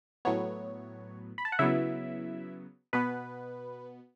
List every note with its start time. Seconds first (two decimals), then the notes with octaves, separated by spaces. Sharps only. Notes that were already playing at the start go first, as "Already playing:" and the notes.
0.25 A2 F#3 B3 C#5
1.38 B5
1.45 A5
1.52 F#5
1.59 C#3 F#3 B3 E4 E5
2.93 B2 B3 B4